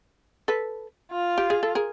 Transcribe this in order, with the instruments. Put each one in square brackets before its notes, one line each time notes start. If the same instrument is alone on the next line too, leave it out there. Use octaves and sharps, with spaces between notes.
[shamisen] A4 B4
[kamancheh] F4
[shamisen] G4
G#4
A4
G#4 A#4